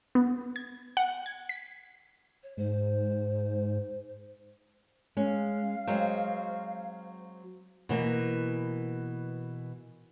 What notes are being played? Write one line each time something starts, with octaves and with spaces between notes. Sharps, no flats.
B3
G#6
F#5
G#6
B6
C#5
G#2 C5
G#3 C#4 F5
F#3 G#3 C4 C5
B2 E3 A#3